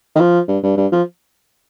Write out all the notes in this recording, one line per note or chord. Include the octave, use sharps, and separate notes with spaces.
D#3
F3
G2
G2
G2
F3